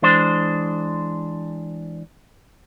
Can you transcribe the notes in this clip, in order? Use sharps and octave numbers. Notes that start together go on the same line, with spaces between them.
E3 G#3 D4 C5